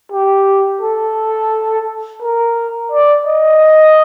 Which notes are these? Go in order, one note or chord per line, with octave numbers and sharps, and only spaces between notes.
G4
A4
A#4
D5
D#5